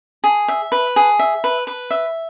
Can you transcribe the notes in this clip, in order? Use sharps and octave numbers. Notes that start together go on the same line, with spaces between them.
G#4
E5
B4
G#4
E5
B4
B4
E5